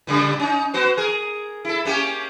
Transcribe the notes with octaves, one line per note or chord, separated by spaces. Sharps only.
A#2 C#3 G3
C#4 D#4
B3 F#4 C5
G#4 A#4
E4 A4
A#3 C#4 G4